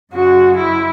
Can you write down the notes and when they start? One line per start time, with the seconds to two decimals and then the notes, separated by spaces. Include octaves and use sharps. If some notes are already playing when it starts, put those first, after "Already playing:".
0.12 F#2 C#3 G#3 F#4
0.56 E4